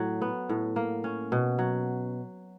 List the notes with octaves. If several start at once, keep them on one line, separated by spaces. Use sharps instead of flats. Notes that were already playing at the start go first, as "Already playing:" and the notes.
Already playing: A2 F#3
B3
A2
A#3
C#4
B2
F#3